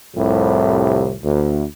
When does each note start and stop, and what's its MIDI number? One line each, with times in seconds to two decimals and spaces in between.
0.15 1.15 36
0.15 1.15 41
0.15 1.15 45
0.15 1.15 48
1.23 1.63 38